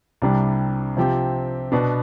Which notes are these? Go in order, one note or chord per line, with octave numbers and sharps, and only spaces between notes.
C2 C3 G3 D4
C3 F3 C4 G4
B2 B3 D4